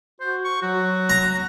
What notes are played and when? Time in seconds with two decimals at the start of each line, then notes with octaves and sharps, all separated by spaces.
0.20 F#4 C5
0.45 C#6
0.62 F#3 F#4
1.10 A#5